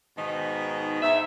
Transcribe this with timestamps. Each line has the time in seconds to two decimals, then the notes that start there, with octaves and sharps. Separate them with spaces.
0.18 G#2 B2 D#3 D#4
1.03 G#2 E5